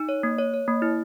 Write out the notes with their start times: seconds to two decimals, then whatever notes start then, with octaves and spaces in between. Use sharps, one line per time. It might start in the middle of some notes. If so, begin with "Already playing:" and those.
Already playing: D#4
0.09 C#5
0.23 A#3
0.38 C#5
0.54 C#5
0.68 A#3
0.82 E4